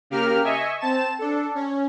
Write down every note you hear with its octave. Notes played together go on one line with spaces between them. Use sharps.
C#3 A#3 G4 A#4 F6
D#5 E5 G#5 C#6
C4 A5 E7
D4 A4
C#4